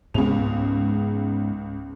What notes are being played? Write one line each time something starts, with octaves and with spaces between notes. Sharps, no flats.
C#2 G#2 B3 G#4 F7